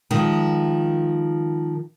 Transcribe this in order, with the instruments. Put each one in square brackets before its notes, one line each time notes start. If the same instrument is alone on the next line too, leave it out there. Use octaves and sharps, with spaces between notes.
[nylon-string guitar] D#3 F3 G#3